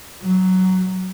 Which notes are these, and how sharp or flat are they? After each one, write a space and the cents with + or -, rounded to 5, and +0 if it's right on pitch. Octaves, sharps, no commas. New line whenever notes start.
F#3 +10